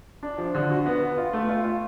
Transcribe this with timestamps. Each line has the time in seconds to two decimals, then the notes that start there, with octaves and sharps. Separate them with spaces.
0.23 D4
0.38 F3
0.55 D3
0.70 F#4
0.86 B3
1.02 B3
1.18 F4
1.33 A3
1.49 F4
1.65 F4